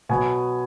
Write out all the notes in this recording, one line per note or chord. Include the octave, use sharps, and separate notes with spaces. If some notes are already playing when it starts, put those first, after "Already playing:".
B2 F#3 B3 G#5